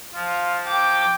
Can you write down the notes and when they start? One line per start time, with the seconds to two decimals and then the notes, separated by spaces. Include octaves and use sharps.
0.14 F3 F4
0.67 G5 D6